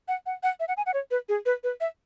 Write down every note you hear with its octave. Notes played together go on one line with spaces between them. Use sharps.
F#5
F#5
F#5
E5
F#5
G#5
F#5
C#5
B4
G#4
B4
B4
E5